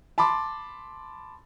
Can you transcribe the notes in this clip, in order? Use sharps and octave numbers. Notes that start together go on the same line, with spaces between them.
A5 B5 C6 D6